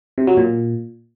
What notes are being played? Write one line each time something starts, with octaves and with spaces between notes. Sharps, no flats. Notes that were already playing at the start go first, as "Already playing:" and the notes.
C3
F#3
A#2